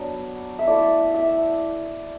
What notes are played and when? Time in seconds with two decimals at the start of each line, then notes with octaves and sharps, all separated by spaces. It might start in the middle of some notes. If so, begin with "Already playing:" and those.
Already playing: F#3 B3 D4
0.59 E5
0.67 A3 E4 D5
1.14 E5